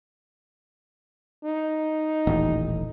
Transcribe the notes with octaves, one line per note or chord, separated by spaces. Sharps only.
D#4
D#1 A1